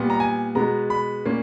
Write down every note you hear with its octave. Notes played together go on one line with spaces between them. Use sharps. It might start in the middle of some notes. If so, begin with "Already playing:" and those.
Already playing: A#2 G3 B3
A#5
G#5
B2 G#3 B3 A#5
B5
A#2 A#3 C#4